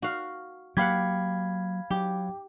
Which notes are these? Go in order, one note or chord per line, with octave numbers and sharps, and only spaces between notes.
F#4 F5
F#3 A#3 G4 F5 F#5 B5 G#6
F#3 G4